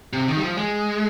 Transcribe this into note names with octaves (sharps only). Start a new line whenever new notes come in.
C3
D#3
G3
F3
G#3